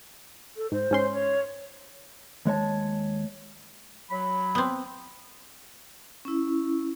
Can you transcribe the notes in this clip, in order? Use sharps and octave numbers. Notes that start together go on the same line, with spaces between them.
A4
G#2 C5
G#2 C#4 C6
C#5
D#2 G#3 C#5 A5
F#3 B5
B3 C4
C#4 E4